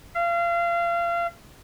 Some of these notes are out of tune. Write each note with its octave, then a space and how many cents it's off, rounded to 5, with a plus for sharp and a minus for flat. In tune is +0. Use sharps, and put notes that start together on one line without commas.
F5 -30